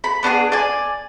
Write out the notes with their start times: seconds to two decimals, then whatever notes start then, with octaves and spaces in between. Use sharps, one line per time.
0.04 B5
0.23 B3 D4 F#4 G#4
0.52 D5 G#5